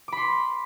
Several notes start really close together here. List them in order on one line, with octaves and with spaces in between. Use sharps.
D6 B5 C6